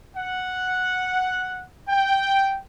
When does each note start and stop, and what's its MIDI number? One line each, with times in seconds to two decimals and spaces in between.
0.17 1.64 78
1.89 2.58 79